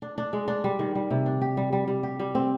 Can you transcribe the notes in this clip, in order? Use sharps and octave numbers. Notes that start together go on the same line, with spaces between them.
D4
D4
G#3
D4
G3
D#3
G3
C3
D4
G4
G3
G3
G3
G4
G3
C4